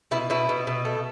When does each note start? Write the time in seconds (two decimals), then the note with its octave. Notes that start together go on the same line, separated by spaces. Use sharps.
0.11 B2 E4
0.30 B2 E4
0.49 B2
0.67 B2
0.85 A3